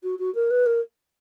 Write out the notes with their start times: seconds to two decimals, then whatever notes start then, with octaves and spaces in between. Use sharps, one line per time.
0.03 F#4
0.19 F#4
0.34 A#4
0.50 B4
0.66 A#4